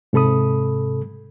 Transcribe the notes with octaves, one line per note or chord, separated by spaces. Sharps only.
G#2 C3 A4 B5 D#6